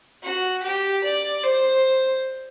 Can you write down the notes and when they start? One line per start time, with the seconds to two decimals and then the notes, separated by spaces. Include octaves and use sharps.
0.23 F#4
0.63 G4
1.04 D5
1.44 C5